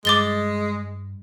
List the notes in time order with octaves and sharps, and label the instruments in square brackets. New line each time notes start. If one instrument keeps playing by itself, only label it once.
[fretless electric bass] G2 [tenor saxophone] G#3 [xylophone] D6 A6 G7